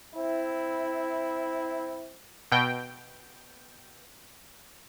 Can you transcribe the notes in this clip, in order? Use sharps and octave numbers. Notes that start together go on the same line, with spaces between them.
C4 E4
B2 G5